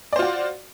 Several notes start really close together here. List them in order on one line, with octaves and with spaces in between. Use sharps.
D5 C5 F4 F#4